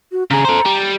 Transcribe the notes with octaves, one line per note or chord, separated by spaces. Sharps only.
F#4
C#3 G#4 A#5
A4 C5
G3